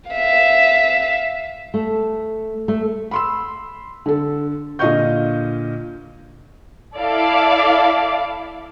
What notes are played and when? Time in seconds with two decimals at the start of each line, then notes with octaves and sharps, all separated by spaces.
0.11 E5 F5
1.74 A3
2.68 A3
3.11 B5 C6 E6
4.06 D3 A4
4.79 A#2 D3 D#5 F5 C#6 G6
6.98 E4 A4 D5 E5 F5 D6